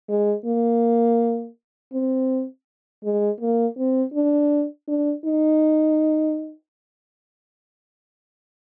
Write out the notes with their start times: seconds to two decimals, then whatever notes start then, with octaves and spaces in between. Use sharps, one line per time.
0.09 G#3
0.46 A#3
1.93 C4
3.04 G#3
3.41 A#3
3.78 C4
4.14 D4
4.88 D4
5.25 D#4